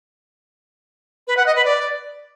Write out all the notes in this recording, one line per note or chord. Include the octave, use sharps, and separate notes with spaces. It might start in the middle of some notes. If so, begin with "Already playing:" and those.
B4
F#5
D#5
B4
D5